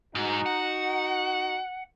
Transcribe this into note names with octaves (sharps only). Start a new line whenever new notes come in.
G#2 D#4 F#4
F#5